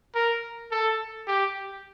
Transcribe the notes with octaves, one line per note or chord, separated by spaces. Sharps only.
A#4
A4
G4